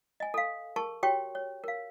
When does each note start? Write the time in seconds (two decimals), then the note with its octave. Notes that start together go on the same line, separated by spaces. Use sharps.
0.20 D#5 G#5
0.34 A4 F5
0.76 G#4 A#4 A5 C#6
1.03 F#4 G4 C#5 G5 C#6
1.35 C#5
1.64 A#4 F5